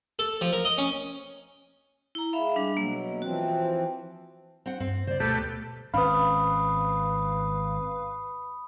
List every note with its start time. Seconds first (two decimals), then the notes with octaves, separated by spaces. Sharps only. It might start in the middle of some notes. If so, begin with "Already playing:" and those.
0.19 A4
0.41 F3
0.53 A#4
0.65 D#5
0.78 C#4
2.15 E4 A#5
2.33 G#3 E5 F5 B5
2.56 G3 D4
2.77 B2 F#3 A#3
3.22 E3 F3 C4 F#4
4.66 C4 F#5
4.80 G2 C4
5.07 C#3 B3 C5 D5
5.20 D2 B2 A3 G4 A4
5.94 G#1 C4 C#4 B4 F5 B5 D#6